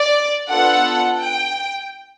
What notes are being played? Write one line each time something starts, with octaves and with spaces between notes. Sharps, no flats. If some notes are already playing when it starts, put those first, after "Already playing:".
Already playing: D5
B3 D4 F4 A4 F#5
G5